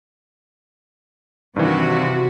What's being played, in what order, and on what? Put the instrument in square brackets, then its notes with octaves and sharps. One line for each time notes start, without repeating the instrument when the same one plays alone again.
[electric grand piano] G2 D#3 E3 [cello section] C3 F#4